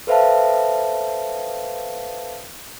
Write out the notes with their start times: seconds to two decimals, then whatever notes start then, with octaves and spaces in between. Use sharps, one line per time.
0.07 A4 B4 C5 E5 F5 A5